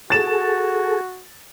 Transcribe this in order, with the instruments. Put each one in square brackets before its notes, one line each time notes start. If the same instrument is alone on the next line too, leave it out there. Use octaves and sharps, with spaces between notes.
[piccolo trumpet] F#4 [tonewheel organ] G#4 A4 [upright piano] A6 E7